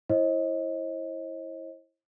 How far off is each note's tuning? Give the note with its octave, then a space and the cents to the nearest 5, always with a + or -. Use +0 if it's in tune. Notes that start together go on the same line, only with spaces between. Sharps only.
E4 +0 C5 +45 D#5 +20